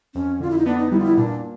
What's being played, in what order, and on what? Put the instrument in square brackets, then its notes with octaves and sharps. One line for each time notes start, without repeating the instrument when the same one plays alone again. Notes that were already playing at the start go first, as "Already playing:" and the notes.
[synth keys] F2 [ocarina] C#4
[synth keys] D3 [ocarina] F4
[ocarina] E4
D#4
[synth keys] B3 [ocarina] D4
[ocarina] D#4
[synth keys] G3 [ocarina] E4
[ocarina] F4
E4
[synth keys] A#2 [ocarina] D4